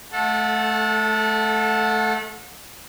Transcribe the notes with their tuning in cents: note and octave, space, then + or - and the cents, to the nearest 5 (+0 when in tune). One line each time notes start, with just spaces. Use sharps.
A3 -25 A4 +0 F#5 -35